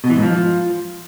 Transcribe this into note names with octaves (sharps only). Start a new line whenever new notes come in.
B2
E3
G#2
F3